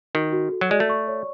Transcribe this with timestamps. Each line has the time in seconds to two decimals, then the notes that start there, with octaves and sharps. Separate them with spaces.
0.15 D#3 F#4
0.33 F#4
0.52 A4
0.61 F#3
0.71 G#3 D5
0.80 A3
0.90 C#6
1.08 C#5